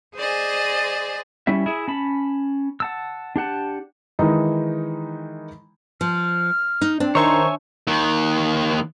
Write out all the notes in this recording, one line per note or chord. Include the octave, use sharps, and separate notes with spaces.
G#4 C5 D5 D#5 G#5
G3 C#4 E4 E5
E4 G#4 E5
C#4 A5 B5
F#5 A5 E6
D4 G4 F#5 A5
D#3 E3 G#3 D#4
F3 F6
D#4
C4 D4
D#3 C5 C#5 E5 G#5 A#5 C#6
D#2 D#3